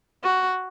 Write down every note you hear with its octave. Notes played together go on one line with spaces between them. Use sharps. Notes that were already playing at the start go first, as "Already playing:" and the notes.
F#4